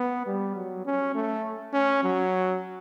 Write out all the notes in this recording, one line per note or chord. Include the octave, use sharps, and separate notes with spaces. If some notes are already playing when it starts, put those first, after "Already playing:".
Already playing: B3
G3
F#3
C#4
A3
C#4
F#3